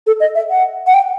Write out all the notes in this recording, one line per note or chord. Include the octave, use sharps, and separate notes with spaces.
A4
D#5
E5
F#5
F#5
G5